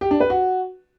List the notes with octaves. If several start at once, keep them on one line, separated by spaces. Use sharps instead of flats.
G4
D4
B4
F#4